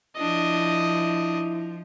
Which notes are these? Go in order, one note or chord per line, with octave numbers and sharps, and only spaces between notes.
F3 D4 E4 D#5